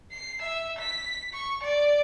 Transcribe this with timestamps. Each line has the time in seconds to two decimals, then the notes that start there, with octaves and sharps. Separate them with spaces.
0.11 C7
0.42 E5
0.79 B6
1.32 C#6
1.63 D5